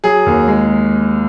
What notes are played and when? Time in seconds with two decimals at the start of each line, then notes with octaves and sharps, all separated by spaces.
0.04 F#3 G#4
0.26 D#2
0.48 G#3